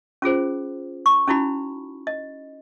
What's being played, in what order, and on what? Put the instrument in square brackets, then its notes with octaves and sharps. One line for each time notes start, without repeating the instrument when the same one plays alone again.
[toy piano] C#4 F4 G#4 C5
C#6
C#4 D#4 E4 F#4 B5
D#5